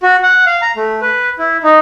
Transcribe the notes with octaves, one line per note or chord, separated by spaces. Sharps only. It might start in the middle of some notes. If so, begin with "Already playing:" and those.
F#4
F#5
F5
A#5
A3
B4
E4
D#4